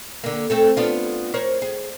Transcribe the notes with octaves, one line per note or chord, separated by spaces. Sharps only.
D3 A#3
A3 C4 A4
B3 D4 F4
A#4 C5 C#5
G#4